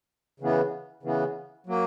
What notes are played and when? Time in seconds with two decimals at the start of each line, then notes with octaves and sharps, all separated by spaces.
0.40 C#3 E3 B3
1.03 C#3 E3 B3
1.66 F#3 A#3